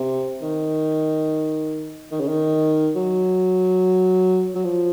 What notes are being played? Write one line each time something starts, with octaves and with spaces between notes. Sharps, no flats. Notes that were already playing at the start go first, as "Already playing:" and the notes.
Already playing: C3
D#3
D#3
C#3
D#3
F#3
F#3
F3